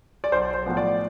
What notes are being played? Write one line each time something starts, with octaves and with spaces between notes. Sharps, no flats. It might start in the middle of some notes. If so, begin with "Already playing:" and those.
D5
B1 C5
C5
A2 F3 B3
D5